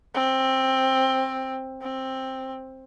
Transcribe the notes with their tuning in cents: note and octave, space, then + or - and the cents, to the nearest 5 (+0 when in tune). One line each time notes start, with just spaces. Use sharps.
C4 +10
C4 +10